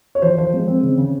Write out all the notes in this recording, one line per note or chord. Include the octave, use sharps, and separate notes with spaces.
C#5
F3 C5
F3 C5
G#3
C4
C#3
C#3